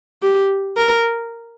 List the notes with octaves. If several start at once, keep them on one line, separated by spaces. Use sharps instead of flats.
G4
A#4